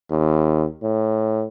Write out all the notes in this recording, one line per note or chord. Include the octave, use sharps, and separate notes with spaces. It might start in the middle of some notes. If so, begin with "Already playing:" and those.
D#2
A2